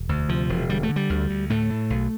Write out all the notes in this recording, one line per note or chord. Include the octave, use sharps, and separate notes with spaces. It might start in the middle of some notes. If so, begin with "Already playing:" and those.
Already playing: E1
D2
C3 F3
E1
D3 G3
A3
D3
G3
D2
D2
A2 A3
A2
B1